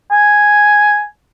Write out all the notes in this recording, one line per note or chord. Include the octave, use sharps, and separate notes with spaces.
G#5